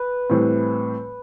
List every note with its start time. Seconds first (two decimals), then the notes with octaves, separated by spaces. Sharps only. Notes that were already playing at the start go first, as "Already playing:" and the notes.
Already playing: B4
0.30 A2 E3 G3 C4